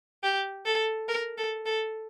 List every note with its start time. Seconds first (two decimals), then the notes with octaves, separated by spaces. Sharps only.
0.23 G4
0.66 A4
1.08 A#4
1.38 A4
1.66 A4